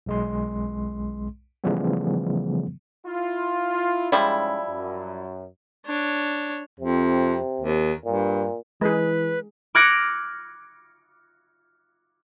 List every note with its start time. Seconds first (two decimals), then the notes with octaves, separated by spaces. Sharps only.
0.06 B1 G#3 C6
1.64 C#3 E3 F3 G3 A3 B3
3.05 E4 F4
4.12 G#2 F3 G3 G#3 C#4 E4
4.68 F#2
5.86 D4 C#5
6.80 F2 C3
7.61 D#2
8.05 G2 A#2
8.81 E3 G#3 G#4 B4
9.75 D6 F6 F#6 G#6 A#6 C#7